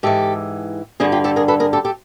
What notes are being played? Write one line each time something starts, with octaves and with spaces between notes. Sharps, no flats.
G#2 E3 G4 A4
G2 D3 F#4 G#4
F4 G4
G4 A4
G#4 A#4
A4 B4
G#4 A#4
G4 A4
G4 A4